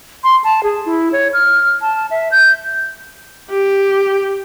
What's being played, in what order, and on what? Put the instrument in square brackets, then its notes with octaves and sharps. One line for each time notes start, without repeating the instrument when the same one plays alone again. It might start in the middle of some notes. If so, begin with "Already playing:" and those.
[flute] C6
A5
G#4
E4
C#5
F6
A5
E5
G6
[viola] G4